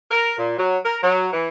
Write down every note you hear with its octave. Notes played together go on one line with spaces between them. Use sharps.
A#4
A#2
F#3
A#4
F#3
E3